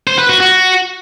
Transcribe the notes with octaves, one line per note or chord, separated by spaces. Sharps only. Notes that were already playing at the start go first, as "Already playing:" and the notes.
C5
B4
F#4
F#4